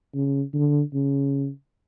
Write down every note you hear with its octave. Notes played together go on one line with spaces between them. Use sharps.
C#3
D3
C#3